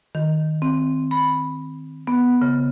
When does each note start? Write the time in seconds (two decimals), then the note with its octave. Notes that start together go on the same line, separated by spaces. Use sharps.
0.15 D#3
0.62 C4
1.11 B5
2.07 B3
2.42 C#3